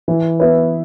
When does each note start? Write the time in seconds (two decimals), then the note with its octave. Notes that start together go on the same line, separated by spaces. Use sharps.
0.08 E3
0.40 B3 E4 B4